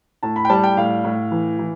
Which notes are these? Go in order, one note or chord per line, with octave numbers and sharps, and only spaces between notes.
A2 A5
B5
G5
G3 A5
G5
A2 F5
A2
E3
E3